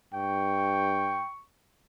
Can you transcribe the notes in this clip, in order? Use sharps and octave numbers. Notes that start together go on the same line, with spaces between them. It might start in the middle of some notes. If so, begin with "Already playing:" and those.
G2 G5 C#6